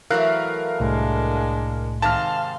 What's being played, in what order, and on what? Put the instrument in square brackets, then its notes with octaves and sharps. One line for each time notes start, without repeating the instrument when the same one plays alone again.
[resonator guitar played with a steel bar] E3 F#3 A3 [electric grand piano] A#4 F5 F#6
[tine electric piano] C2 A2 [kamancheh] G#3 D4
[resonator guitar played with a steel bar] G#2 C3 D#3 [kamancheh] F5 C6 [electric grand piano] A5 F6